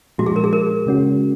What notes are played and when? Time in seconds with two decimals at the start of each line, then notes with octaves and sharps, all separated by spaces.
0.18 A#2 F3 G#3 F#4
0.26 G#4
0.36 A#4
0.44 G#4
0.53 A#4
0.86 C#3 G#3 C#4 F#4